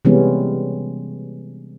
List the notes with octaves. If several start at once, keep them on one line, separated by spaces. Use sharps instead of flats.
C3 E3 G3 G#3 B3 C#4